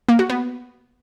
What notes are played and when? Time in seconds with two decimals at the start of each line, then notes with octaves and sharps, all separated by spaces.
0.09 A#3
0.19 F#4
0.30 B3